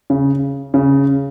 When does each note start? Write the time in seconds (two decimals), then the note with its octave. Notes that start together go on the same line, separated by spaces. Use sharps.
0.10 C#3
0.74 C#3